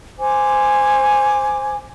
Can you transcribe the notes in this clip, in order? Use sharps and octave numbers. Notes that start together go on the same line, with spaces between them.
C5 G#5 D6